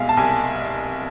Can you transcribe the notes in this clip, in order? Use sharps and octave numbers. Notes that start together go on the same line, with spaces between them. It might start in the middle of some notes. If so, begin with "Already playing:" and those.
Already playing: C2 B2 G#3 E5 F5 G#5
A5
C2 G#5